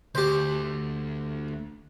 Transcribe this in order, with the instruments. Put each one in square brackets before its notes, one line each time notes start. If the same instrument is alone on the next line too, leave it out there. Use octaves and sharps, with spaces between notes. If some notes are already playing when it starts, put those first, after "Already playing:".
[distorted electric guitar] D2 [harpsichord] G4 C5